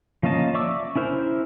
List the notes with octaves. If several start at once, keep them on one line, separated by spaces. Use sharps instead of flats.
F3 A#3 C#4 D#5 A5
D5 E5 C#6 D6 E6
C#4 E4 A#4 C5